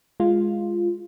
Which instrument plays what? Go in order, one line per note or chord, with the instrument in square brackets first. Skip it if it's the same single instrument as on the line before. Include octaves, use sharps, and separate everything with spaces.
[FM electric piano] G#3 F4